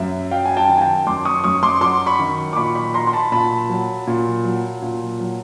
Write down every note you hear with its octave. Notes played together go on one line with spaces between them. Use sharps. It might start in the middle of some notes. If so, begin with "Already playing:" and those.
Already playing: F#2 E5
F#3 F5 G5
G#5
G5 A5
D#3
G#5
G5 A5
F#2 C6 D6
C#6 D#6
F#2 C#6 D#6
C6 D6
F#3 C6 D6
B5 C#6
D#3
D6
A#2 B5 C#6
B5 C#6
F#3 A#5 C6
C6
A5 B5
A#2 A5 B5
F#3
A#2
F#3
A#2
F#3